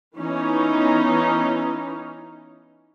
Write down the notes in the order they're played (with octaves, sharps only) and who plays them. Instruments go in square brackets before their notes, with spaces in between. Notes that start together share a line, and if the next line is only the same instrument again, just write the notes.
[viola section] E3 B3 C#4 D#4